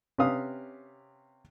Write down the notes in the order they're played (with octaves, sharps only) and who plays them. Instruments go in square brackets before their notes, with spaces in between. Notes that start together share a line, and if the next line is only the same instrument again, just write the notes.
[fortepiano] C3 C#4 B4 F5 D#6